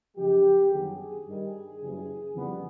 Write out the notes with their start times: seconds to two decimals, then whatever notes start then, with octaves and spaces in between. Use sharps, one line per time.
0.16 F#2 C#3 F3 G#3 G4
0.71 G1 F#2 D#3 F#3 B3 G#4
1.25 G2 D#3 G3
1.80 F#1 F#2 C#3 E3 G3
2.34 F2 C#3 E3 G3 B3